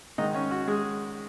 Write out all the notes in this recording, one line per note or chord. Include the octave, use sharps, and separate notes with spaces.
G#2 D#3 G#3 D#4 D#5
C#4 C#5
F#4
G#3 G#4